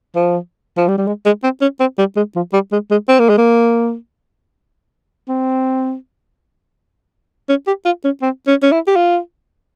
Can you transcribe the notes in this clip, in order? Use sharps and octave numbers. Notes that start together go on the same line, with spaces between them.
F3
F3
G3
G3
G#3
G#3
C4
C#4
C4
G3
G#3
F3
G3
G#3
G#3
C4
A#3
G#3
A#3
C4
C#4
G4
F4
C#4
C4
C#4
C#4
E4
G4
F4